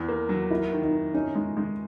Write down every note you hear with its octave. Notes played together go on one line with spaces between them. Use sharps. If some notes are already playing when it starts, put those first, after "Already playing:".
Already playing: E2
A#3
F#3
A#3 E4
D#3
D#4
D#3
C#4 D#4
G#3
G#3